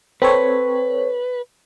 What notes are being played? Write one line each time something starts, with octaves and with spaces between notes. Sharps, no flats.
C4 A4 B4 C#5